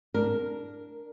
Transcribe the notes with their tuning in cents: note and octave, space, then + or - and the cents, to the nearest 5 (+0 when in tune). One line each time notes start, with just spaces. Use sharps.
D4 +0 A#4 +0